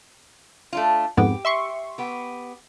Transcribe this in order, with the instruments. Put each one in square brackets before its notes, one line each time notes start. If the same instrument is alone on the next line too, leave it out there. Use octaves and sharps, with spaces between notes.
[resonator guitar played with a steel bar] A3 D4 F4
[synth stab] F2 G#2 B3 [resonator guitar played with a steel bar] G4
[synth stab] E5 C6 C#6
[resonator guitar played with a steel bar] B3 G4